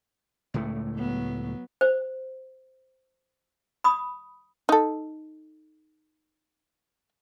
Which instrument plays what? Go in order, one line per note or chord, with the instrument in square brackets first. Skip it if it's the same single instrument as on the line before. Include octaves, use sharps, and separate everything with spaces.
[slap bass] C#2 A2 A3
[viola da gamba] F#3 B3
[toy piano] C5
B5 D#6
[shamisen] D#4 A4